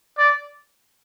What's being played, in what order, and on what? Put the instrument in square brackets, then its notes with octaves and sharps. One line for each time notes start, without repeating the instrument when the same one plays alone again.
[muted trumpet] D5